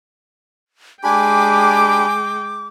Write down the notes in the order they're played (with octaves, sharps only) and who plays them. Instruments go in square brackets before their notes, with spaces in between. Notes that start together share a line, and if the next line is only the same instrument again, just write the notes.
[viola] G#3 G5 [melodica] D4 G4 B5 [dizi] G#5 [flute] D6